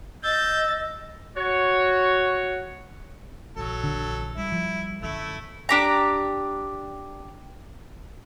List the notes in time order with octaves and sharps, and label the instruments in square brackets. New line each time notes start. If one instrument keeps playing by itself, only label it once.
[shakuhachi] D#5 [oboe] E6 [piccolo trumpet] G6 [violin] A6
[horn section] F#4 C#5
[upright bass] A#1 E3 [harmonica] F#3 A4
[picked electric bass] D3
[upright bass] G3 [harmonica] E4
[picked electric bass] F3
[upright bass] F#2 D3 [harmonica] A3 E4
[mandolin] D4 G4 A#5